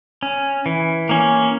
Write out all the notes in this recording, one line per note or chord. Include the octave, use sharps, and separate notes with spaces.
C#4
E3
A#3 C#4